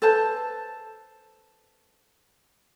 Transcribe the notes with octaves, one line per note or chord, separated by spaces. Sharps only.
A4 B4 C5 A5